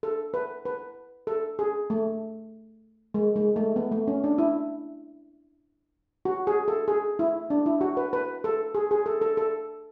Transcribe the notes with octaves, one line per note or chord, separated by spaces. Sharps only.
A4
B4
B4
A4
G#4
A3
G#3
G#3
A3
B3
A3
C#4
D4
E4
F#4
G#4
A4
G#4
E4
D4
E4
F#4
B4
B4
A4
G#4
G#4
A4
A4
A4